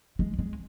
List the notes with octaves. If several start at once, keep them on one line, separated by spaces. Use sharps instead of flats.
G#3
G#3